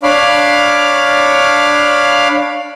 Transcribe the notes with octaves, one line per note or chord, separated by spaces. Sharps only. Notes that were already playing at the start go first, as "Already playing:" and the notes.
D4 C#5 F5 B5 D6 F6